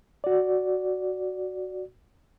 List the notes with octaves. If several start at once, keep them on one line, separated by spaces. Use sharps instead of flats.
F#4 D5